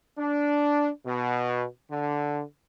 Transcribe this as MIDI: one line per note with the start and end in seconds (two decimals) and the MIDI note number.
0.18 0.89 62
1.06 1.65 47
1.91 2.41 50